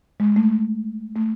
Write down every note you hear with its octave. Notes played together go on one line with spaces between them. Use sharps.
G#3
A3
A3